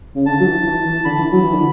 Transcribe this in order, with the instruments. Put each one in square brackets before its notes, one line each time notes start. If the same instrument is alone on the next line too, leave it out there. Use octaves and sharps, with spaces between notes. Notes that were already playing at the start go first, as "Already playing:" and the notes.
[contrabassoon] C#3
[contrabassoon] D3 [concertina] A5
[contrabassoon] F#3
E3
E3
E3
[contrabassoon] D3 [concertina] B5
[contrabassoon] E3
F#3
E3
D3